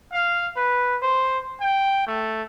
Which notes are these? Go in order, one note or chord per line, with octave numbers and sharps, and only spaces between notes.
F5
B4
C5
G5
A3